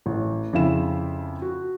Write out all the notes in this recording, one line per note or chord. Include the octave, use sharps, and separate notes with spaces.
A1
F2 C#3 E4 E5 F5 E7
F#4